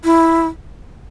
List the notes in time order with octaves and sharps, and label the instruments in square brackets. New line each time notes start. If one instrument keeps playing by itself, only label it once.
[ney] E4